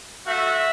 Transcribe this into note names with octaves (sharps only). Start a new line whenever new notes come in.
A3 F#4 E5